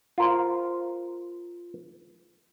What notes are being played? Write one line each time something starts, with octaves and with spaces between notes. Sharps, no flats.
F4 A#4 C5